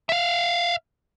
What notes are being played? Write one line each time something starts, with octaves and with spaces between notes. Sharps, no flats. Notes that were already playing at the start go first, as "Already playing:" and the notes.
E5 F5